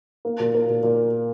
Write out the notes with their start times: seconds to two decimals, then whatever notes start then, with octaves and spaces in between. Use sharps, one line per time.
0.25 A#3
0.40 A#2
0.54 A#3
0.69 A#2
0.83 A#2